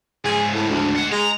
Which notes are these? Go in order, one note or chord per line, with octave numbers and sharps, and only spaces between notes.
C#2 G#2 G#4
A2
D2
G#3 F#5
G#3 A#5